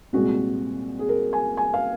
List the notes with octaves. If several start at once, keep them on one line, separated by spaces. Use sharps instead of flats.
C2 A#2 G#3 C4 F#4
G#4
A#4
G#5
G#5
F5